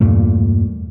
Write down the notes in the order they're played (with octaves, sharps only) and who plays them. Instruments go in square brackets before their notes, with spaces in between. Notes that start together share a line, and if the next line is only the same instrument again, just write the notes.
[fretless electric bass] E2 G2 A#2 A3